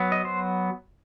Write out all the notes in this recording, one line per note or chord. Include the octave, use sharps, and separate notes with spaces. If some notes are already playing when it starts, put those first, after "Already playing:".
Already playing: F#3 B3
D#5
C5